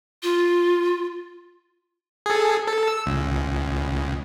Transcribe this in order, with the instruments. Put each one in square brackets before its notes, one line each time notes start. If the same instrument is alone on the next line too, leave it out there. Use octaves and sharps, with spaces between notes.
[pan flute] F4
[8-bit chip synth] G#4 A4
A4
E6
C#2